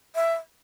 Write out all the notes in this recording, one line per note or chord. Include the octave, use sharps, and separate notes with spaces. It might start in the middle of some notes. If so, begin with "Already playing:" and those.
E5